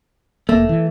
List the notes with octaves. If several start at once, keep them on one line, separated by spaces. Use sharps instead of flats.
F1 A3 A#3
E3